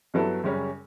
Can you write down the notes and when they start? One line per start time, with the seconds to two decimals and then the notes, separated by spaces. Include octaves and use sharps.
0.14 G2 F#3 B3 E4 A4
0.44 F#2 C#3 G3 C#4 G4